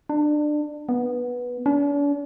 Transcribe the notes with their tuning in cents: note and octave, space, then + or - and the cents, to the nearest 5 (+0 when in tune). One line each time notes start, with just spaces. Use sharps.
D4 +25
B3 -10
D4 -45